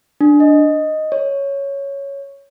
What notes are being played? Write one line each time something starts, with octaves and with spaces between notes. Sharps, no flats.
D4
D#5
C#5